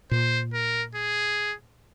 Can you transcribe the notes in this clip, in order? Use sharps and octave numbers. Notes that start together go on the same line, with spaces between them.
A#2 C5
A#4
G#4